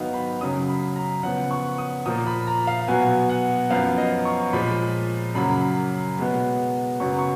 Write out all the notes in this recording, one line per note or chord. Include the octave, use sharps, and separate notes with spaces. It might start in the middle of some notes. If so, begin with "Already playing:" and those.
Already playing: G#2 D#3 F#3 B3 D#5 F5
B5
F#2 C#3 F#3 D#6
B5
A#5
C#3 F3 B3 F#5
C#6
D#6
A#2 F3 A#3 D#6
B5
A#5
F5
B2 F#3 B3 G#5
F#5
F#2 F3 B3 F5
D#5
C#6
A#2 F3 G#3 B5
F#2 C#3 F#3 A#3 B5
B2 G#3 B3
F#2 C#3 F#3 B3 C#6
C#6